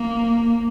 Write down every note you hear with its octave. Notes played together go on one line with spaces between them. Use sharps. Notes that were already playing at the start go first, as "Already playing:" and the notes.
Already playing: A#3